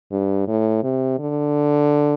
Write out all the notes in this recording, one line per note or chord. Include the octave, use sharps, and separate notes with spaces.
G2
A2
C3
D3